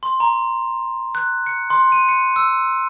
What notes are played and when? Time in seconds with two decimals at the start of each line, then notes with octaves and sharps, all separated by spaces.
0.03 C6
0.20 A#5
1.15 F#6
1.46 C#7
1.70 C6
1.92 D#7
2.09 C#7
2.36 E6